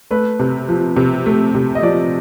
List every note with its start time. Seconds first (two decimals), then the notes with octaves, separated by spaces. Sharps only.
0.11 A3 B4
0.40 C3
0.69 F3
0.96 C3
1.26 A3
1.55 C3
1.75 D#5
1.83 F3 D5